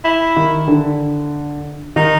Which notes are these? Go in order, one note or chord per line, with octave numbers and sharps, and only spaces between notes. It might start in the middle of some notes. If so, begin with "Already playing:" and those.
E4
D#3
D3
D#3 D#4